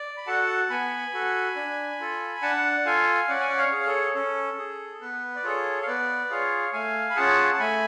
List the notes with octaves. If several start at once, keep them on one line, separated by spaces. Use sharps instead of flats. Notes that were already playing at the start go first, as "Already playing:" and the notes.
Already playing: D5
B5
F#4 A4 F#5 A5
B3 G#5 B5
F#4 A4
D4
F4 A4
D4 F#5 A5
F4 A4 F5 G#5
C#4 D5 F#5
G#5
F#5
C#5 F5
G#4
A4 C#5
C#4 A4
G#4
B3 B4
D5
F4 G#4 A4 C#5
F5
B3 B4 D5
F4 G#4 C#5 F5
A3 F5 G#5
B5
C#4 F4 G#4 F#5 A5
A5
A3 G#5 B5